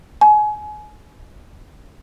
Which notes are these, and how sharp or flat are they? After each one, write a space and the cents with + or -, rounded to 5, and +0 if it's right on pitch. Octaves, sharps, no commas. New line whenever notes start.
G#5 +30